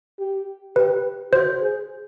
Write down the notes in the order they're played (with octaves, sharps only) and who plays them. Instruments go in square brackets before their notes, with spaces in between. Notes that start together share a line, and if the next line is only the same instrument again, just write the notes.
[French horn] G4
[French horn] G4 [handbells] B4
[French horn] F#4 [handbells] C5
[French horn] G#4